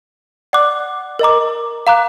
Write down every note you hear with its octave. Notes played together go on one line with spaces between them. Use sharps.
D5 F#5 D6 F#6
A#4 D#5 A#5 D6
F5 A#5 D6 F#6